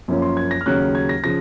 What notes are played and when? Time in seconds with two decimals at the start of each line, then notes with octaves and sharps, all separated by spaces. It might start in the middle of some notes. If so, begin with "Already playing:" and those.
0.08 F#2 F3 A#3 C#4 F4
0.22 C6
0.37 G#6
0.51 A#6
0.61 F6
0.66 D#2 C#3 F#3 C#4 F#6
0.95 G#6
1.09 A#6
1.24 C#3 F3 A#6